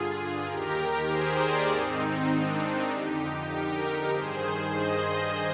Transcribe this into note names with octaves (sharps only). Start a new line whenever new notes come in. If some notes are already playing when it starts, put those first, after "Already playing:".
Already playing: G2 D3 F4 G#4
D#2 D#3 G4 A#4
G#4 C5
A#4 D5
G#2 D#3 C4 D#4
D4
F2 D3 D#4 G4
G4 A#4
G2 D#3 G#4 C5
C5 D#5
C5 D#5